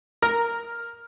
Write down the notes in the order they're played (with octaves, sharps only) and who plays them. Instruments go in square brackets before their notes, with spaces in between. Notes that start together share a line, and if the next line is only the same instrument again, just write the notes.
[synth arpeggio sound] A#4 [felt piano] F6